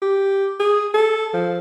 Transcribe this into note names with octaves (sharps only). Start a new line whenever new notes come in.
G4
G#4
A4
F3